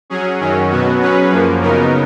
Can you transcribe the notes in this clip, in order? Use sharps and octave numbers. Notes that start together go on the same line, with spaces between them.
F#3 C#4 G#4
F#2 D#3 F#3 C#4
B2 F#3 B3 F#4
F#3 C#4 G#4 B4
F#2 F3 A#3
C#3 F#3 B3 D#4 A#4